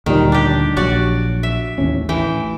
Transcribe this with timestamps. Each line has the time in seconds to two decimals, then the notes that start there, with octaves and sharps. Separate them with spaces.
0.06 D2 A#2 D#3 G3
0.32 D4 G4
0.77 A#1 F#3 F#4 D5
1.43 E5
1.78 A1 D#2 C#4
2.09 A1 E3 G5